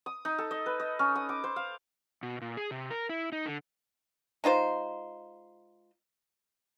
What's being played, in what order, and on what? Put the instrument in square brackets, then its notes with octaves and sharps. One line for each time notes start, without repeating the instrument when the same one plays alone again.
[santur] D#6
D#4
A4
D#5
B4
D#5
C#4
D#6
D6
C5
F5
[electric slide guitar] B2
A#2
G#4
C3
A#4
E4
D#4
D3
[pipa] G#3 D#4 F4 C5